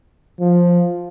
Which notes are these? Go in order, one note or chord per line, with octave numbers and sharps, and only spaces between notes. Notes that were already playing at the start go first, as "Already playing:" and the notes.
F3